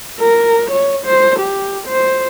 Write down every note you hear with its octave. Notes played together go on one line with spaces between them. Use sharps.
A#4
C#5
C5
G4
C5